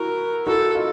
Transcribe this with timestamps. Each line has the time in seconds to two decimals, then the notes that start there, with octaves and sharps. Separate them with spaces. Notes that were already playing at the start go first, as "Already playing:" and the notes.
Already playing: E4 F#4 A#4
0.46 E4 F#4 A4
0.75 D#4 F4